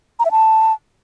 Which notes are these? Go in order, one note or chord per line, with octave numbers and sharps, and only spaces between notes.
A#5
E5
A5